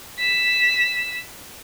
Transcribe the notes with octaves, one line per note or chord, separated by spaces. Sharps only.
B6 E7